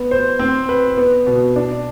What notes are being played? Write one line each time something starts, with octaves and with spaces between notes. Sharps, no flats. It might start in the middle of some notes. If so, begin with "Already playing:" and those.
Already playing: B3
C5
C4
B4
B3
B2
D4